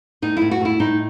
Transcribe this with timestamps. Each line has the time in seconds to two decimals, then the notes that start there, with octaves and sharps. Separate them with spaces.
0.22 A2 D#4
0.37 A2 E4
0.51 F#4
0.61 A2 E4
0.79 A2 D#4